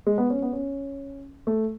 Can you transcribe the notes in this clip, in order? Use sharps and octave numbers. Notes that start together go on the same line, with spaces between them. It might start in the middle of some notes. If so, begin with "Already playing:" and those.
G#3
B3
C#4
B3
C#4
A3